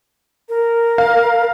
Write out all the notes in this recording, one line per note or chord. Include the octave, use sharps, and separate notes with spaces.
A#4
F5